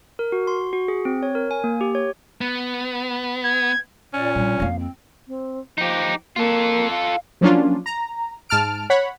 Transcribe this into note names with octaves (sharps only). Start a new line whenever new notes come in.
A#4
F#4
C6
F#4
G#4
C4
C#5
A#4
G#5
A#3
G4
C#5
B3
G#6
A#2 C#4 D5
A#1 G3
F2 A#3 F5
C4
C4
F3 D#4 G4
A#3 F4 A4
F5
F3 F#3 A#3 C#4 D4 F4
A#5
G#2 A5 F6 D7
C#5 F#5 B5